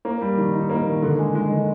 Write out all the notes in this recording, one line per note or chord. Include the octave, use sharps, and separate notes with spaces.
A#3
G3
D#3
D#4
A#3
D#3
D3
G#3
G#3
D3